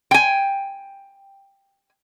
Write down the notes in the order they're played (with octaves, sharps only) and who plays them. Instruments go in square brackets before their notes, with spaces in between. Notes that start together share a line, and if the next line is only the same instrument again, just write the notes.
[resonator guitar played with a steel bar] G5 G#5